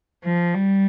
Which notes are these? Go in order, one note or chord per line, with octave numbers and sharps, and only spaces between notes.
F3
G3